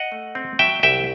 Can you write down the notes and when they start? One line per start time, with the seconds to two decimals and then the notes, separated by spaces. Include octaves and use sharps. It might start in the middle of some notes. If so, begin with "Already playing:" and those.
Already playing: D#5 F#5
0.12 A3
0.35 C4
0.59 F#3 E5 G5
0.83 C2 E5 G5